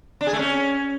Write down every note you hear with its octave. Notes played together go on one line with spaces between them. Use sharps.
D4
G#4
A3
C#4